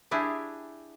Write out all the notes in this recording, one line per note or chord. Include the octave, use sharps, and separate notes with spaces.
D4 E4 G4 G#4